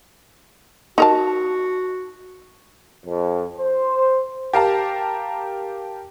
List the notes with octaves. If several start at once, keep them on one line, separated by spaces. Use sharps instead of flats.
D#4 F#4 A#4 A5
F2
C5
G4 A#4 F5 A5 A#5